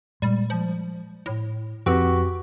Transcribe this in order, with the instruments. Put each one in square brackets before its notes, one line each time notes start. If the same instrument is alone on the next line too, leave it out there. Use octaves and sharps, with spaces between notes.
[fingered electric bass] A#2 G#3 [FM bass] G3
[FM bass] F3
A2
[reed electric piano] F2 [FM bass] C4 [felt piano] F#4 G4 B4